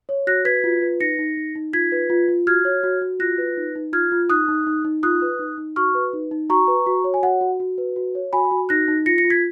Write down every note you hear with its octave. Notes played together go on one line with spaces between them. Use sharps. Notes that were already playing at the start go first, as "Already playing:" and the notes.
C#5
F#4 F#6 A#6
B4 G#6 B6
F4
B4
D#4 A#6 C#7
D#4
D#4
D#4
F4 G#6 B6
B4
F4
F4
F#4 F6 G#6
C#5
F#4
F#4
F4 F#6 A#6
B4
D#4
D#4
F4 F6 G#6
F4
D#4 D#6 F#6
D#4
D#4
D#4
F4 D#6 F#6
B4
D#4
D#4
F#4 C#6 F6
B4
D#4
D#4
F#4 A#5 C#6
B4
F#4
C#5
G#5
F#4 F#5
F#4
F#4
B4
F#4
C#5
F#4 G#5 B5
F#4
D#4 F#6 A#6
D#4
F4 A#6 C#7
A#6 C#7
F4
G#6 B6